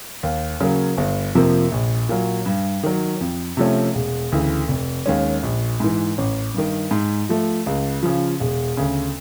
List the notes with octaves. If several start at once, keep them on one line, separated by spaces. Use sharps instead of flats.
D#2
C#3 F#3 A#3
G1
F2 C3 F3 A#3
A#1
A#2 F#3
G2
D#3 F#3
F2
C3 F3 A3 C#4
E1
D2 C#3 E3
F1
D#2 D#3 G#3 C#4
A#1
G#2 E3
A1
G2 D#3
G#2
F3 A3
C#2
C#3 F3
E1
D2 C#3